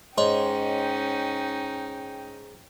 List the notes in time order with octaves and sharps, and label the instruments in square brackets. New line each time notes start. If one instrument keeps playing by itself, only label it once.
[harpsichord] G#2 [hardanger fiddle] C#4 D#4 [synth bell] C#5 D#5 C6 [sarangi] G5